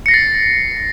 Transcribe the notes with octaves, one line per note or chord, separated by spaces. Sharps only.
A6 A#6 C7 C#7